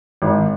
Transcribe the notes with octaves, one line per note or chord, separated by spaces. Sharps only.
G#1